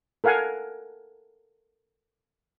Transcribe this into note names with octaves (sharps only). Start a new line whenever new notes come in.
A4 A#4 F5 F#5 G#5